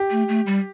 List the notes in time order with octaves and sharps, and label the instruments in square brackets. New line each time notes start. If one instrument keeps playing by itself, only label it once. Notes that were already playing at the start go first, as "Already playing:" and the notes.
Already playing: [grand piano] G4
[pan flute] A3
A3
G3